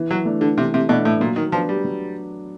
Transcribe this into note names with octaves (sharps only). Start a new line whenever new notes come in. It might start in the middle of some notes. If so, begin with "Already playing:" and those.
Already playing: E3
F#3
A3 D4
D3
C3 E3
C3
B2 A3 D4
A2
A#2 F#3
D#3
F3 B3 D4
G3
F#3